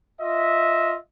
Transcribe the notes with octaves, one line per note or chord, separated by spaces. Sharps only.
F4 D#5 E5